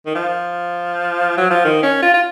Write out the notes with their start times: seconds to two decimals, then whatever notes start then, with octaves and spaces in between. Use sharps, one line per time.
0.06 D#3
0.15 F3
1.37 F#3
1.51 F3
1.65 D#3
1.83 C#4
2.02 F4
2.14 F4